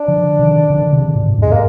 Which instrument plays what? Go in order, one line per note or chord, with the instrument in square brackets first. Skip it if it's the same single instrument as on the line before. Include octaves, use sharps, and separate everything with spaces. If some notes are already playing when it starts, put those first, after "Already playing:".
Already playing: [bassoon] D4
[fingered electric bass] D3 F3
C3 D#3
D3 F3
C3 D#3
G#2 C3
[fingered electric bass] F2 G#2 [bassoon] G#3
[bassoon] A#3